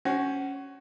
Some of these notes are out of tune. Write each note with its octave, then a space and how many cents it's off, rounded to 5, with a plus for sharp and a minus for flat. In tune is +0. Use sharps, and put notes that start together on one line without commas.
C#4 +0 F#4 +25 C5 +10